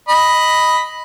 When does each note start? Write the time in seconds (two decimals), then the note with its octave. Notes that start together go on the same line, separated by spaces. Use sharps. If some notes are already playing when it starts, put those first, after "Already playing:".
0.09 D#5 B5